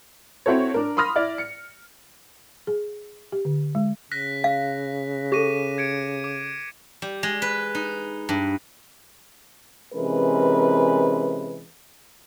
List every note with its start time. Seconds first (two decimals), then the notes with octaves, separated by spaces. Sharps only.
0.46 C4 E4 F#4 A4 C#5
0.74 D4 A#4
0.97 B5 C6 D#6 F6 A#6
1.16 E4 D5
1.38 C#7
2.67 G#4
3.32 G4
3.45 D3
3.75 G#3
4.12 C#3 F#6 A#6 B6
4.44 F5
5.32 G4 A4 D6 A#6 D#7
5.78 G#6 C#7 D7
6.24 D6
7.02 G3
7.23 G#3
7.42 B4
7.75 D#4
8.29 G2
9.94 C3 E3 G#3 C#4 A#4 B4